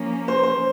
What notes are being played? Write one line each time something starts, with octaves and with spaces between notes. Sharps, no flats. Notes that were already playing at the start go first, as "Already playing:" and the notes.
Already playing: F3 A#3 C#4
C5
C5